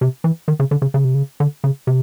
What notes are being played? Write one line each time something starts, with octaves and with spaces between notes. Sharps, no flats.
C3
E3
D#3
C#3
D3
C#3
C#3
C3
C#3
D3
C#3
C3